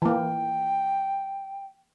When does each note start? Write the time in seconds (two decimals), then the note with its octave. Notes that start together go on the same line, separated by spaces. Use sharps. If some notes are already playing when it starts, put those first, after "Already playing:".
0.02 E3 A#3 G5